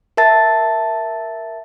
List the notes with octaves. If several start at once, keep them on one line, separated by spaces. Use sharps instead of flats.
A#4 E5 A5 A6